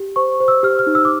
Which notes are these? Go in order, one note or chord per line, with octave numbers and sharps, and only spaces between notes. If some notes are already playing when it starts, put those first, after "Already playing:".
Already playing: G4
C5 C#6
C5
E6
G4 F6
F6
D#4
E6
D6